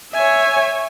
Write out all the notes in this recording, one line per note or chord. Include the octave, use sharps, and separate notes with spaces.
C#5 E5 G#5